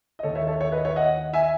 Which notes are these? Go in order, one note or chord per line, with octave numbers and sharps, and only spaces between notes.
D#5
D#2 D#3 A4 C#5
C#5 E5
A4 C#5
C#5 E5
B4 D#5
C#5 E5
D#5 F#5
E5 G#5